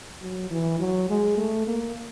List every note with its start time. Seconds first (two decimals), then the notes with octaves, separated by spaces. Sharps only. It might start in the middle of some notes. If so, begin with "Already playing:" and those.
0.22 F#3
0.51 E3
0.80 F#3
1.10 G#3
1.37 A3
1.67 A#3